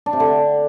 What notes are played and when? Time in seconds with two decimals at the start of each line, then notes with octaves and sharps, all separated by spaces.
0.06 D4
0.13 C3
0.20 D3